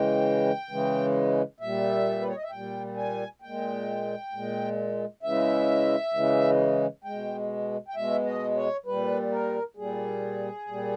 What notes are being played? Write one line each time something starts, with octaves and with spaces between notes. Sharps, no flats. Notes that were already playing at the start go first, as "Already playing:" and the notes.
Already playing: C#3 E3 G#3 G5
C#3 E3 G#3
A#2 G3 E5
B4
C#5
D#5
E5
A#2 G3 G5
G#5
A#2 G#3 G5
A#2 G#3
C#3 E3 G#3 E5
C#3 E3 G#3
B2 G#3 G5
G5
B2 G#3 E5
D#5
C#5
A#2 G3 B4
A#4
A#2 G3 G#4
A#2 G3